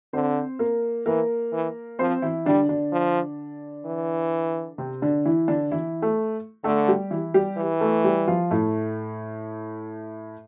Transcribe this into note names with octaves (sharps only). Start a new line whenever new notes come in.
D3 C4 C5
A#3 A#4
E3 A#3 A#4
E3
F3 C4 C5
E3 E4
D3 G3 D4
D3 D4
F3
E3
C3 C4
D3 D4
E3 E4
D3 D4
E3 E4
A3 A4
D3 A3 A4
G3 G4
E3 E4
G3 G4
E3
A3 A4
G3 G4
F3 F4
A2 A3